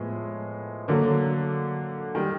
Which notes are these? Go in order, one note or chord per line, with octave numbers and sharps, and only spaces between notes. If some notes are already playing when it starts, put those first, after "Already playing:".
Already playing: A2 F3 G#3 B3
D3 F#3 A#3
D#3 G3